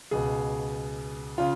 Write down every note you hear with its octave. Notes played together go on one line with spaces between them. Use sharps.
C#2 B2 G#4
C#3 F4